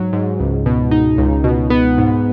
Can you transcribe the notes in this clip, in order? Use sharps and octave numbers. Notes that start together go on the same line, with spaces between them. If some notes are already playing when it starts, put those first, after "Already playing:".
Already playing: G#2 F#3
G#2
C#2
B2
D#4
C#2
B2
B3
G#2